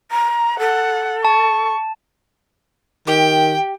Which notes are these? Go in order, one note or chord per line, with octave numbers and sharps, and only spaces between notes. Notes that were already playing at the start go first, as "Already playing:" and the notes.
A#5
A4 F#5
A5 C#6
D#3 G4 G5